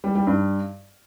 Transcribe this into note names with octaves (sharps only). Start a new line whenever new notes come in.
G3
G3
G2